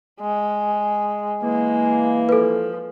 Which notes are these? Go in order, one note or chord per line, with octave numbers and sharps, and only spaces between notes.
G#3
E3 G#3 A#3
F3 A4 B4